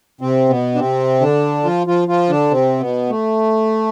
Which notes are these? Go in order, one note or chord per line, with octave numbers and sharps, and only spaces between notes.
C3 C4
B2 B3
D4
C3 C4
D3 D4
F3 F4
F3 F4
F3 F4
D3 D4
C3 C4
B2 B3
A3